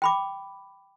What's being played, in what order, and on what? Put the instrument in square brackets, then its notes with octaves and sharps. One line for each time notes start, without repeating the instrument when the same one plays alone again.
[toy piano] G5 B5 D6